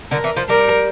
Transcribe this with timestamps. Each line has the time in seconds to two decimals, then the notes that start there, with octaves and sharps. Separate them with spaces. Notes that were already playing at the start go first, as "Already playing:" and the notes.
0.11 D3 A#4
0.24 E3
0.37 F3
0.49 G3 A#4